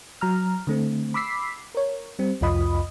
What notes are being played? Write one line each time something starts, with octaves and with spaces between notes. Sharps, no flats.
F#3 A#5 F6
D3 A3 C4
B5 D6 E6 B6 C7
A#4 C#5
G3 C4
C2 F2 F4 D#5 B5 D#6